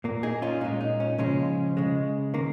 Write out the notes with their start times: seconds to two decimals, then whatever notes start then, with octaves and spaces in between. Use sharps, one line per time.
0.04 A#2 A#3
0.23 D#4 G#4
0.42 C#4 F4
0.61 A#2 G#3 D#4
0.81 D#4
1.00 C#4
1.18 C#3 F3 G#3 C#4
1.77 C#3 G#3
2.34 D#3 A#3